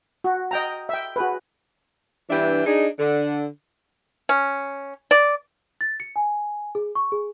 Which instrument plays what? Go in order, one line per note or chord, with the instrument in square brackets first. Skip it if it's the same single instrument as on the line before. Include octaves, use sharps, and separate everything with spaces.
[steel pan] F#4
D#5 G5 A#5
E5 G5
F#4 G#4 B4
[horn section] G2 E3 B3 D4 E5 G5
D4 D#4 G#4
D3
[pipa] C#4
D5
[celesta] A6
C#7
G#5
G#4
C#6
G#4